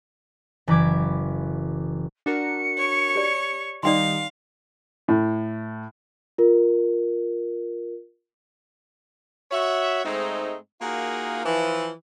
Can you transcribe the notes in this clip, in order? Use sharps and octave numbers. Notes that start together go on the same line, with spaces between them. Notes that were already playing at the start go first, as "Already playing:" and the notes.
F#1 E3 B5 D6 G#6
D4 F#4 A#4 C#7
C#5
G4 D5
D#3 G3 D#4 D5 F5 G5 C6
A2
F4 A#4
F#4 C#5 E5
G#2 G#3 A3 C4 D#4
A#3 D#4 F4 F#4 G#4 A#4
E3 F3